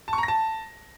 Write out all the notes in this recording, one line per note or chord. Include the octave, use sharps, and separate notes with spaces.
A5
C#6
A#5
A#6
A5